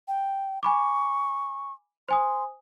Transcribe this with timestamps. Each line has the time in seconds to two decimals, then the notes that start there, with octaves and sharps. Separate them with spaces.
0.08 G5
0.63 G#5 B5 C#6 D6
2.09 C5 G#5 C6 D#6